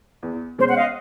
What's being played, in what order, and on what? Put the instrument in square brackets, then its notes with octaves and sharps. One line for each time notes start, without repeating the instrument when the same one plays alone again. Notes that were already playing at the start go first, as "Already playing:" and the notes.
[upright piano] E2
[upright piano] B2 G#3 C#4 [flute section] C5
[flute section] F#5
D#5 F5